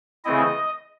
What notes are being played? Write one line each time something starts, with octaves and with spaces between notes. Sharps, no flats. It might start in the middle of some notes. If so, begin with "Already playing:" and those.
C#3 E3 A3 C4 E4 D#5